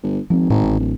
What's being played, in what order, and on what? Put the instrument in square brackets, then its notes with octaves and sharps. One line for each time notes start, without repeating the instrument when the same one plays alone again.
[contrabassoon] G1
[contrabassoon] G#1 [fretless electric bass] F3 C4
[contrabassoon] G#1 [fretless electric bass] A2
[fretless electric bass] A1
[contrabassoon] D1